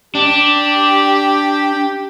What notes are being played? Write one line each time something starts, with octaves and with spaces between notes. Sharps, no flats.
D4 G4